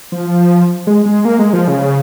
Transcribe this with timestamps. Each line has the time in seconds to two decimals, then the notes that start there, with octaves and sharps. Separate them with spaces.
0.12 F3
0.87 G#3
1.06 G#3
1.25 A#3
1.39 G#3
1.53 F3
1.68 C#3